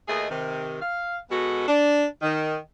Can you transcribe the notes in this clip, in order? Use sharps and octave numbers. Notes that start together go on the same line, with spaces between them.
D#2 A3 G#4 D#5
C3 D#3
F5
B2 G#3 B3 F#4 A4
D4
D#3